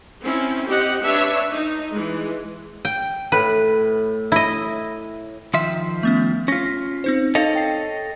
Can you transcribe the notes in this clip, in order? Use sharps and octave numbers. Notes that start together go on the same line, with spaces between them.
C4 C#4 E4
C4 G4 D#5 F#5
D4 B4 C#5 E5
D#4
E3 G#3
G5
A2 B4
E4 D#5
D#3 F3 E5 C6
A3 B3 C#4
C#4 F4 A#6 B6
C4 D#4 C5
D#4 A4 C#5 D#5 F5 F7
G5 A#6 C7